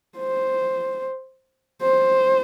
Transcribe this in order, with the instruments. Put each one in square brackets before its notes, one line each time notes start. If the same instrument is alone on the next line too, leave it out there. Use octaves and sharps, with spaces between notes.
[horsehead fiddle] C5
C5